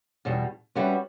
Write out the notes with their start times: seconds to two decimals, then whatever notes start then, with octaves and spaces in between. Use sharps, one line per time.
0.25 E2 B2 G3
0.75 G3 C#4 F#4 B4 E5